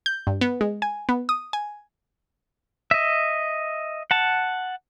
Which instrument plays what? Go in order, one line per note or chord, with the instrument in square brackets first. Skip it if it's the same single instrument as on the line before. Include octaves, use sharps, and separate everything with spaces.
[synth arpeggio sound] G6
G2
B3
G#3
G#5
B3
D#6
G#5
[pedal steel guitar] D#5 E5
F#5 A5